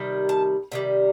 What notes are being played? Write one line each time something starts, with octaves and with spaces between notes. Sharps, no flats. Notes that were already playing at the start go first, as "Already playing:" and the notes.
Already playing: C3 D#3 G3
A5
C3 D#3 G3